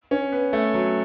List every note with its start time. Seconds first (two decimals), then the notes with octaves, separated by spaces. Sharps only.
0.11 C#4
0.32 B3
0.53 A3
0.74 F#3